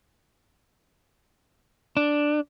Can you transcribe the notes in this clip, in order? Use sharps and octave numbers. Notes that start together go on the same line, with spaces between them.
D4